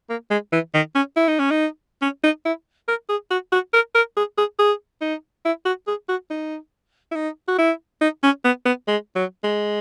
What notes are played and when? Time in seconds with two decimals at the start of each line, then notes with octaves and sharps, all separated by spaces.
0.10 A#3
0.31 G#3
0.52 E3
0.74 D#3
0.95 C#4
1.16 E4
1.28 D#4
1.39 C#4
1.51 D#4
2.02 C#4
2.24 D#4
2.45 E4
2.88 A#4
3.09 G#4
3.31 F#4
3.52 F#4
3.73 A#4
3.95 A#4
4.17 G#4
4.38 G#4
4.59 G#4
5.01 D#4
5.45 E4
5.65 F#4
5.87 G#4
6.09 F#4
6.30 D#4
7.11 E4
7.16 D#4
7.48 F#4
7.58 E4
8.01 D#4
8.23 C#4
8.44 B3
8.65 B3
8.88 G#3
9.16 F#3
9.44 G#3